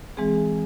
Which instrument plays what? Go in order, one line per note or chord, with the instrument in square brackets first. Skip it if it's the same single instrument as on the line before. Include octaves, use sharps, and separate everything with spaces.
[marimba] E3 G#3 C4 G#4